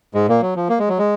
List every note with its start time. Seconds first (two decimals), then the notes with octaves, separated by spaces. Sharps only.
0.14 G#2 G#3
0.28 A#2 A#3
0.42 F#3
0.56 F3
0.69 A#3
0.79 G#3
0.89 F#3
0.99 G#3